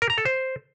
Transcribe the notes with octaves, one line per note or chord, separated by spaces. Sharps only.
A#4
A#5
A4
C5